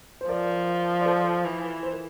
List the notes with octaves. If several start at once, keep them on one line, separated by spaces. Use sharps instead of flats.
C5
F3 A#4 D5
D5
A4 C5
E3
C5
A#4